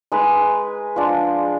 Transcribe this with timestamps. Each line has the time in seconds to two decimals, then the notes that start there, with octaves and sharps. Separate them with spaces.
0.12 G#3 D#4 G#4 B4
0.96 F3 G#3 D4